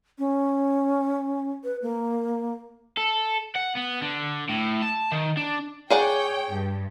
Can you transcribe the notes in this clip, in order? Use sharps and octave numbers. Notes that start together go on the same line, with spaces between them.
C#4
B4
A#3
A4
F#5
B3
D3
A2
A5
D#3
D4
G#4 C#5 D5 F#5 G5
G2